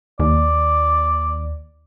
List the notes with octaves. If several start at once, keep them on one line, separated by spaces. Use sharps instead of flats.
D#2 D5